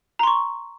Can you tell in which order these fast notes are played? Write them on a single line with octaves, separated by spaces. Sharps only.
A#5 C6 C#6